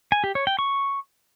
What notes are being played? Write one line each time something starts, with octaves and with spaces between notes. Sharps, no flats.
G#5
G4
C#5
G5
C#6